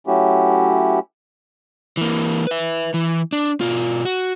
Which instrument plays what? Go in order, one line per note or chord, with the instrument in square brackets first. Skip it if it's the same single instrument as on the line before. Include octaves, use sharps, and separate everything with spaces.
[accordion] F#3 A3 C#4 E4 F#4 G4
[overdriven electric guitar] E3 A#3
B4 E5
E3
D4
B2 F4
F#4